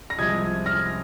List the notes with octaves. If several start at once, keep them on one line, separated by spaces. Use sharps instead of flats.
A#6
C2 C3 F3 G#3 D#6 G#6
F6 A#6